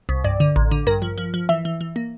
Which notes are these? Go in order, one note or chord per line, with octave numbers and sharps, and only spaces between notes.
C2
G2 D5
D3
A1
D3
G2 A#4
F3
F3
F3
E3 E5
E3
E3
A#3